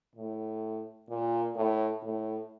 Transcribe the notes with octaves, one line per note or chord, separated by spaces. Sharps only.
A2
A#2
A2
A2